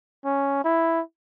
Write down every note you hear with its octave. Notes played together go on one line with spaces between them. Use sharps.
C#4
E4